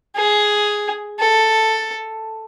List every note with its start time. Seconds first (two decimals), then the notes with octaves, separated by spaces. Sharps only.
0.16 G#4
1.20 A4